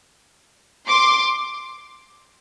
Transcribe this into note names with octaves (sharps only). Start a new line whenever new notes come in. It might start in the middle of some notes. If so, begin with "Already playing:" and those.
C6 D6